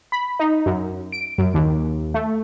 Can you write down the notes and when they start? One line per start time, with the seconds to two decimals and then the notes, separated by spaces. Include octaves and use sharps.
0.12 B5
0.39 D#4
0.66 F#2
1.12 D7
1.38 F#2
1.54 D#2
2.14 A3